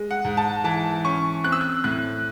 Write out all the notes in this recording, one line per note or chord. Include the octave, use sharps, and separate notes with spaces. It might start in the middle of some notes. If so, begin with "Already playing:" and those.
Already playing: G#3
F#5
G#2
A5
E3 A5
C#4 C#6
C4 F#6
E6
F#6
A2 F#6